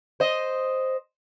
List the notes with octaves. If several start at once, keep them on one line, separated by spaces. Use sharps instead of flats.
C5 D#5